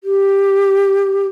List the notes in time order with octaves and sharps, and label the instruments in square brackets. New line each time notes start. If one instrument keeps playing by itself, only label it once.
[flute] G4